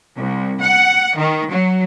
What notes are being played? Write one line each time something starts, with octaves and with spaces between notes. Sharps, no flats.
C2
F#5
D#3
F#3